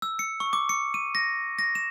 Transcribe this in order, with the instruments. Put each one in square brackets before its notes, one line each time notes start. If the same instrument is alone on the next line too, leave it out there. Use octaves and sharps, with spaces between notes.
[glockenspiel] E6
C#7
C#6
D6
C#7
D#7
A#6
A#6
E7